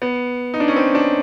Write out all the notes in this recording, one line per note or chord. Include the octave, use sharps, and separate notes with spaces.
B3
D#4
D4
C#4
C4
D4